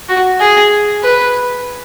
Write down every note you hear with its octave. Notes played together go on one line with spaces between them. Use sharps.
F#4
G#4
B4